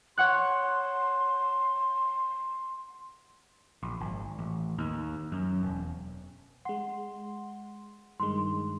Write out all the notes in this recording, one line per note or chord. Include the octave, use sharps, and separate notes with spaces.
C#5 F#5 C6 F#6
A#1
G#1
A1
D#2
F#2
E1
G#3 F#5 C6
G2 D#3 G#3 C6